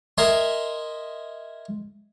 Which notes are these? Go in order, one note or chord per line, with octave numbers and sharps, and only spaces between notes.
A#4 D#5 E5 G#5 C6